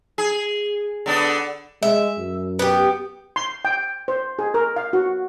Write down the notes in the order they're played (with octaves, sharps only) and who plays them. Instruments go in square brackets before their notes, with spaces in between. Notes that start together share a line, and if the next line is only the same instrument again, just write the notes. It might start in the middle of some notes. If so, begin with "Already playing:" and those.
[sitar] G#4
D3 B3 D4
[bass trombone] G#3 [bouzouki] E5
[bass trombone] F#2
[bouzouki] B3 G4
[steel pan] C6
G5
C5
G#4
A#4
F5
F#4